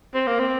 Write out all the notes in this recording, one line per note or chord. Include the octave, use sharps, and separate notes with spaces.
C4
A#3
C4